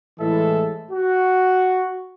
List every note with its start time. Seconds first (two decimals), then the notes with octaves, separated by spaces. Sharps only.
0.20 A2 E3 G#3 A4 E5
0.91 F#4